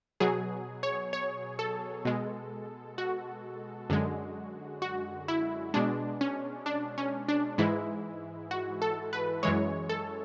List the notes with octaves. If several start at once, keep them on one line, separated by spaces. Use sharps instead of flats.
B2 F#3 G#4
C#5
C#5
A4
B2 G#3
F#4
F#2 D3 G#3
F#4
E4
B2 G#3 D4
C#4
D4
C#4
D4
G#2 E3 G#3 E4
F#4
A4
B4
F#2 E3 G#3 C#5
A4